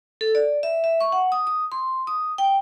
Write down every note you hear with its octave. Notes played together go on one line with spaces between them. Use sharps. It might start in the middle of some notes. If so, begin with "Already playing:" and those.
A4
D5
E5
E5
C#6
F#5
D#6
D#6
C6
D#6
G5